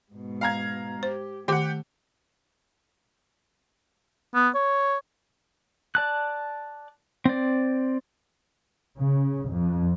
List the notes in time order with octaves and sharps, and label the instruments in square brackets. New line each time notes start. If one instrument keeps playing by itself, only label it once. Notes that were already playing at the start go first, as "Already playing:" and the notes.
[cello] G#2 B2
[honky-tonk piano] F5 A#5 G#6
[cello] G4 [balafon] C5
[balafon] D#3 D6 [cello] A3 [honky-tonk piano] G4 F#5
[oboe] B3
C#5
[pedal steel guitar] D5 A5 F#6
C4 D5
[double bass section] C#3
F2